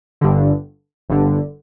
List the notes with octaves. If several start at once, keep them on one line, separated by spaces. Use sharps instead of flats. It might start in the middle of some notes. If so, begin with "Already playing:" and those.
G1 G2 D3
G1 G2 D3